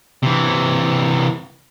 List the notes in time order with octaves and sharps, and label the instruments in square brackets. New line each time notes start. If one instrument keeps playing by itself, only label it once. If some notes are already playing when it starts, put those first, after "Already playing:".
[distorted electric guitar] C3 E3